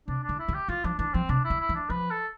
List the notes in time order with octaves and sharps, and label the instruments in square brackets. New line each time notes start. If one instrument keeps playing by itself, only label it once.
[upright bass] C3 [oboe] D4
[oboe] D4
[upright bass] D3
[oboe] E4
[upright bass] D3
[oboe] G4
[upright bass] E3 [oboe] F4
[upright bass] F3 [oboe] D4
[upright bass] E3 [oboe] D4
[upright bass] F3 [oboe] C4
[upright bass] C3 [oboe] D4
[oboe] E4
[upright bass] D3
[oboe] E4
[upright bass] E3
[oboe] D4
[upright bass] F3 [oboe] B4
[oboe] A4